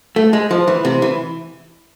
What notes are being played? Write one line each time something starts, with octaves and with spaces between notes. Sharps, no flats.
A3
G#3
F3
E3
C3
E3